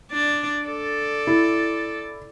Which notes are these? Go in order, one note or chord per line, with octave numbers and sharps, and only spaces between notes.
D4 D5
A4 D5
E4